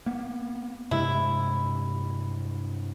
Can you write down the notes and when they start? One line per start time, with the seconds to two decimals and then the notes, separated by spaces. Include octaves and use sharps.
0.06 A#3 B3
0.91 G2 C3 G#3 E4